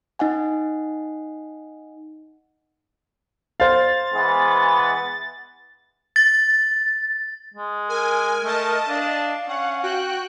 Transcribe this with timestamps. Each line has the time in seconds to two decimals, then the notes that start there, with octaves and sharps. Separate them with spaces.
0.19 D#4 D#5 F#5 G#5
3.60 C5 F5 A6
4.14 E3 G#3 B3
6.16 A6
7.54 G#3
7.89 A#4 G#5
8.45 A3 D#5 A5
8.89 D4 F5
9.49 C#4 F#5
9.83 F#4 G5 F#6